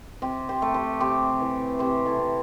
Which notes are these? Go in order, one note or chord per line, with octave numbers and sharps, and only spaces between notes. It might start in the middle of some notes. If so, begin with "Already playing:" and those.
C3 G4 C5
G4 C5
A3
G4 C5
C3 G4 C5
E3
C3 G4 C5
E4 A4
C3